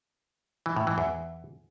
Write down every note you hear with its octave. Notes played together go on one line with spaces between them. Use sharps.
E3
A2
E3
E2